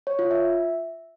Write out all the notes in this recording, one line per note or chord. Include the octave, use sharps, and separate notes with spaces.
C#5
F4
E5